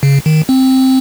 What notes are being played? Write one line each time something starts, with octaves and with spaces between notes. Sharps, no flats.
C#3
D#3
C4